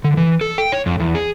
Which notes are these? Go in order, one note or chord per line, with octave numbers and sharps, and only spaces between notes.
D3
E3
A4
G5
C#5
F2
E2
G#4